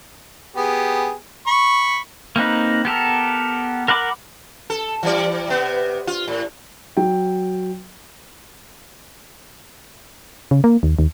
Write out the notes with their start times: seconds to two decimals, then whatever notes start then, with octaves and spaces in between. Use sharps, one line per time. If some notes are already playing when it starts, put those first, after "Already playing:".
0.56 B3 G4 G#4
1.47 B5 C#6
2.36 A#3 C4 D#4 B4
2.85 B3 G4 A4 A#4
3.88 A#4 F#5 B5 D6
4.70 A4
5.03 E3 G3 D5
5.48 C3 B3
6.07 F4
6.28 A2
6.97 F#3 G5
10.51 C#3
10.64 A#3
10.83 D#2
10.99 D#2